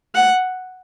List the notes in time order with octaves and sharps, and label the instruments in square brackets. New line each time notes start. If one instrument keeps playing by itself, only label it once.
[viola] F#5